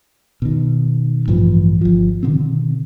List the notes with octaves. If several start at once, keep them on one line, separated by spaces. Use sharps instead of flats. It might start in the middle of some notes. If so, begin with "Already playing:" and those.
B2 D#3
A1 G2 E3 F3
G1 F3
B2 D3 D#3 C4